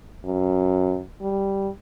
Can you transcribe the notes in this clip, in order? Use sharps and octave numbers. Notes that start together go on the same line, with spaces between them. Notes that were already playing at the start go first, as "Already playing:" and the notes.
F#2
G3